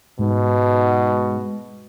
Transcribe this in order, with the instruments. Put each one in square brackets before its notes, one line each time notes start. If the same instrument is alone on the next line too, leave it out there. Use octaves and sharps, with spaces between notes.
[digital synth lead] G#2 [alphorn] B2